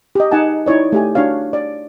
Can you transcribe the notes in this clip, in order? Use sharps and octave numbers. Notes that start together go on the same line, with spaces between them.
G4 D#5
D#4 F#5 G#5 A5
D#4 E4 C#5 D5
A3 G4 G#5
D4 F#4 C#5 F5
D5